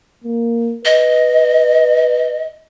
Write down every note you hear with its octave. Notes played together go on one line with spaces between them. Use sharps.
A#3
B4 D#5